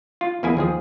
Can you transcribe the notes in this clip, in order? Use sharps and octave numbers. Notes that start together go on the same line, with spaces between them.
F4
E2 A#3 E4 G#4 G#5
D#2 F3 G#4